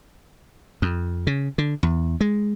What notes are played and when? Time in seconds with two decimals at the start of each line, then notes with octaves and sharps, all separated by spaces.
0.82 F2
1.27 C#3
1.58 D3
1.83 E2
2.21 G#3